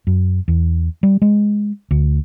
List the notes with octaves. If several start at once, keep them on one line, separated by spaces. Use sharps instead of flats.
F#2
E2
G3
G#3
D2